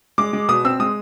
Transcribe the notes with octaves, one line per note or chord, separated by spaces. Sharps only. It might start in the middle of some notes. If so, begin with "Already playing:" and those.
G#3 D6
G#3
B2 D#6
C4 E6
G#3 D#6